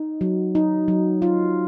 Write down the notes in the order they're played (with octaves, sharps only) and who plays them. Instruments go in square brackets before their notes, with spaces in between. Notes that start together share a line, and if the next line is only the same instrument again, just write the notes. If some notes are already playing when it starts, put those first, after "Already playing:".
Already playing: [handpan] D#4
F#3
D#4
F#3
F4